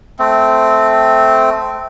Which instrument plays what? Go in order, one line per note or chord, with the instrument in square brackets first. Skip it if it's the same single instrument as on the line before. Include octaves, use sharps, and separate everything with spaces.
[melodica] A3 C4